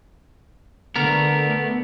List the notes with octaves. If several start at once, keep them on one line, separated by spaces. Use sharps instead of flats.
D3 A3 B3 A#4